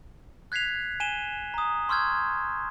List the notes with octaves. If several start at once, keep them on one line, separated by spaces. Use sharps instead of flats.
F#6 G#6 B6 C7 F7
G#5 D#7 E7 G7
A#5 D#6
C6 C#6 E6 F6 G6 G#6